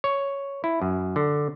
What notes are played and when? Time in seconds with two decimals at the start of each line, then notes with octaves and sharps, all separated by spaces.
0.04 C#5
0.64 E4
0.82 F#2
1.16 D3